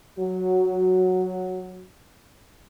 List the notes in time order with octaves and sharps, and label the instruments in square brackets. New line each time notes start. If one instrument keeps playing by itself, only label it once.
[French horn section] F#3 F#4